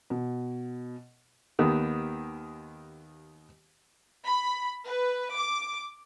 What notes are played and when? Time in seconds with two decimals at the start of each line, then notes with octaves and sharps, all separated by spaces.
0.10 B2
1.59 D#2 D#3 B3 G4
4.26 B5
4.87 B4
5.36 D6